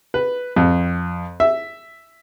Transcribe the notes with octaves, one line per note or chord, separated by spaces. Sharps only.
B4
F2
E5